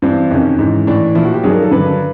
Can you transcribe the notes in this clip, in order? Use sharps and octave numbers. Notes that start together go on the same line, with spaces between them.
G2 E3 C4
F2 C3 D#3 C#4
G#2 E3
A2 E3 D4
A#2 F3 E4
F#4
G4
G2 D#3 F#3 G#4
A#4
A4
G2 D3 F#3 B4